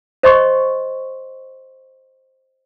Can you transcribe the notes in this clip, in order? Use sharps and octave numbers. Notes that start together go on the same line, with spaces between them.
C5 D#5 C6 C#6